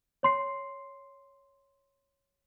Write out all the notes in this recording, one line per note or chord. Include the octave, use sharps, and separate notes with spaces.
C#5 C6 C7